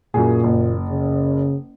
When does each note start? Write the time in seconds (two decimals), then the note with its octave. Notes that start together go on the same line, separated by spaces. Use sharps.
0.14 F#2 A#2 G#4
0.44 F#1
0.89 C#3